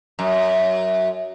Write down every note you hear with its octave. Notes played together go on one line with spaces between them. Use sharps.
F#2